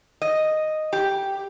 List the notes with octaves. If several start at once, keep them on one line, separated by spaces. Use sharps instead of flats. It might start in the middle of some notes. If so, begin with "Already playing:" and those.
D#5
G4